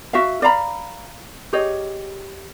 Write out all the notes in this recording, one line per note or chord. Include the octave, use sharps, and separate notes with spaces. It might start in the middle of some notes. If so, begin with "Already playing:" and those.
F#4 E5 F5
D5 F5 A#5 B5
G4 G#4 C#5 D#5